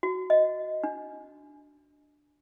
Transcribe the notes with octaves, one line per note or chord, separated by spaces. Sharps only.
F#4
D#5
D4